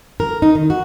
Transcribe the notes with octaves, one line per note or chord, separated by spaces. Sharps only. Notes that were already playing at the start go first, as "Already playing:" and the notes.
A#4
D#4
D#3
F#4